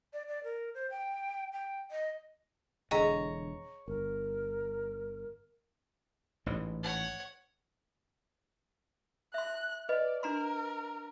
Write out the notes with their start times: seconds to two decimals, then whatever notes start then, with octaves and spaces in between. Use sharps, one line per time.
0.13 D5
0.28 D5
0.44 A#4
0.74 C5
0.90 G5
1.53 G5
1.91 D#5
2.91 E1 D3 E3 G#4 C#5 D#5 G5 A#5
3.88 G1 A#4
6.46 A1 G#2 E3
6.83 C#5 F#5
9.34 E5 C6 F#6
9.89 B4 D5 D#5
10.23 D4 A#4 A#5 C6